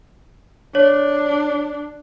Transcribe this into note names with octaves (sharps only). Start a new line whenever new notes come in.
D4 C#5